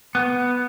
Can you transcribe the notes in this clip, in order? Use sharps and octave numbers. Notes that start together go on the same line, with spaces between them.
B3